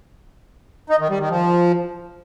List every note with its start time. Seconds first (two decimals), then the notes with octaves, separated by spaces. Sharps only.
0.90 D#4
1.00 D#3
1.10 G3
1.19 D#3
1.29 F3